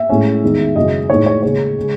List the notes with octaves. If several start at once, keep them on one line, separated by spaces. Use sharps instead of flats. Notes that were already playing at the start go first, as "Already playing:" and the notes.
Already playing: E5
A2 G#3 C#4
E2 D#3 G#3 D#4
F#2 C#3 E3 G#3 D#5
A2 G#3 D#4 C#5
C#5
D#2 C#3 G#3 C#5
C#3 G#3